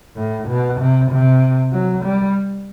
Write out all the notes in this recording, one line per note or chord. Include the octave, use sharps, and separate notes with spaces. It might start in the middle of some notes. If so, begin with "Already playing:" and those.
A2
B2
C3
C3
F#3
G3